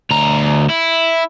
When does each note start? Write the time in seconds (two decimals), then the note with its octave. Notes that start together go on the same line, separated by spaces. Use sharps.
0.11 D2 A#5
0.70 E4